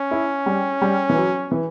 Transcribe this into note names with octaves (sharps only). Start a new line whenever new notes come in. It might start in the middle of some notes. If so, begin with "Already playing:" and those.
Already playing: C#4
E4
G3
G3
E3
F#3
E3